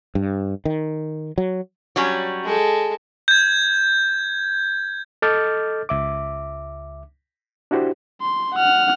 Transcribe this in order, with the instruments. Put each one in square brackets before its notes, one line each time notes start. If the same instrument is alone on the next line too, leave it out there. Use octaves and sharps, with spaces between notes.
[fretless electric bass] G2
D#3
F#3
[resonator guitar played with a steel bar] F#3 G3 C#4
[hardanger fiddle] G#3 A4
[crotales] G6 G#6
[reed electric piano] A4 D#5 D6 F6 G6 A6
C#2 E5 D6
D4 E4 F#4 G4 C5
[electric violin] C6
F#5 F6